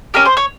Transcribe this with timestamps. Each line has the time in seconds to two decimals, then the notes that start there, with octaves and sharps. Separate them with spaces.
0.14 C#4 G4 A#4
0.25 C5
0.37 C#5